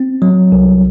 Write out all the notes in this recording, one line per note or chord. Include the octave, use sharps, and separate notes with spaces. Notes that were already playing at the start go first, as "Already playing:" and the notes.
Already playing: C4
F#3
C2